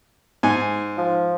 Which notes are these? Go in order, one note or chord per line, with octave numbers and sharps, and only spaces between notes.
G#2 G#5
F3